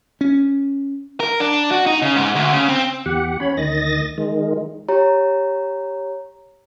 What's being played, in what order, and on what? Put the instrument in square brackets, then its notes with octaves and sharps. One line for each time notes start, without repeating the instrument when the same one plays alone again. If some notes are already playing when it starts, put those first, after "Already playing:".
[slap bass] C#4
[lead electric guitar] A#4
D4
F#4
D#4
C#3
G#2
D2
C#3
C4
[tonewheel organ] E2 G4 F#5
C#4 C#5 B5
D2 D#3 D#5 A6 A#6
D#3 G#3
[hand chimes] G4 C#5 A#5